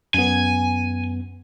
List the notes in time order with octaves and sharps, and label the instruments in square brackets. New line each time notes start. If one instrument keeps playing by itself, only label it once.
[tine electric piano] F#2 B3 [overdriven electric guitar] G#5